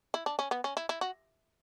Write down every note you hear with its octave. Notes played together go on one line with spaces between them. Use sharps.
E4
D4
C#4
B3
C#4
E4
E4
F#4